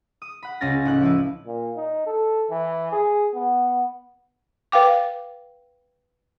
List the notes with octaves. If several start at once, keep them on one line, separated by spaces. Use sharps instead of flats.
D#6
F#5 B5
C#2 C#3 C#4 G#5 A6 A#6
A1 D#4 F#6
F3 E4 B4
A#2
D#4
A4
E3
G#4
B3
B4 F5 G5 D6